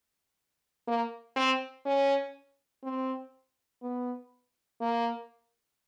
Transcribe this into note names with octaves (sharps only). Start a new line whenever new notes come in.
A#3
C4
C#4
C4
B3
A#3